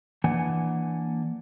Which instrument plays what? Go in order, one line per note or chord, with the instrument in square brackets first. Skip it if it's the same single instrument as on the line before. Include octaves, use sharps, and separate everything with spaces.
[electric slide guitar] E3 A#3 D4 F#5 G#5